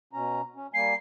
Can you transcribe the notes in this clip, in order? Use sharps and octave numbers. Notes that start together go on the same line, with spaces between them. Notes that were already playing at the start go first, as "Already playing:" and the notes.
B2 C#4 A#5
C#4
G3 A#3 G#5 C7